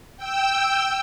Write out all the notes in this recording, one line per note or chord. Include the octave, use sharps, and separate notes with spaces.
G5 E6